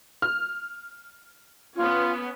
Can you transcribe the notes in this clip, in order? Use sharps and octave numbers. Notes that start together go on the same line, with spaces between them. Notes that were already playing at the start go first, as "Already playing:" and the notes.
F6
B3 C#4 F4